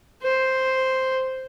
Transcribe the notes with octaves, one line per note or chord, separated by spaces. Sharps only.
C5